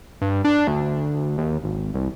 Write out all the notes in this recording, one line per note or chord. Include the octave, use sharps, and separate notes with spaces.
G2
D4
D2
D#2
G#1
C2